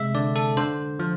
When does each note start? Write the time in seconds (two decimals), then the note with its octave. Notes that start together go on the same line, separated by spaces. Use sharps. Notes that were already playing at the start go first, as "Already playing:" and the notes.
Already playing: C3 G#3 E5
0.15 D3 D5
0.36 A4
0.57 D3 C5
0.99 F3